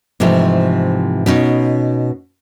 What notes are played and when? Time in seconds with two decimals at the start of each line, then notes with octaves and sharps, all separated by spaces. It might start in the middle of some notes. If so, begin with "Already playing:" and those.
0.20 G#2 C3 E3 F3 A3
1.26 B2 C#4 D#4